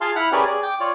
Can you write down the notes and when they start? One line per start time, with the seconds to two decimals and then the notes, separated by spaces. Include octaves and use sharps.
0.01 F4 G#4 F5 A5 C6
0.16 E4 F#5 B5 F6
0.32 C#4 G4 G#4 A#4 B4 D5
0.45 G#4 D5
0.63 G5 D6
0.80 F4 C#5 D5